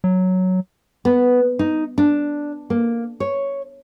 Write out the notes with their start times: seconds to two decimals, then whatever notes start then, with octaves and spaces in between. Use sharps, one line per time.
0.04 F#3
1.05 B3
1.59 D#4
1.98 D4
2.70 A#3
3.20 C#5